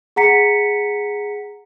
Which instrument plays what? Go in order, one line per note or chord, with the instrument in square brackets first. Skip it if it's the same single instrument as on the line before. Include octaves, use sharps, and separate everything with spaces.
[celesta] G#4 F#5 A#5 B6 C#7